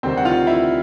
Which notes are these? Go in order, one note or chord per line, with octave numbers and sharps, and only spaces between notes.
D2 C3 D#3 G3 C4 C5
F#5
F4 F5
E4 E5